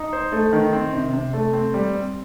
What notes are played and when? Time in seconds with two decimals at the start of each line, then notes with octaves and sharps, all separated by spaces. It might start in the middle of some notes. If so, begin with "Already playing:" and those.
Already playing: D#4
0.13 C5
0.32 A3
0.53 D#3
0.73 C4
0.93 C3
1.13 C3
1.33 A3
1.53 C4
1.74 G3
1.95 C4